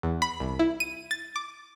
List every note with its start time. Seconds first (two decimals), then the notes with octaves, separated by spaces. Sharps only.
0.03 E2
0.22 B5
0.40 C2
0.59 E4
0.80 D#7
1.11 A6
1.36 D6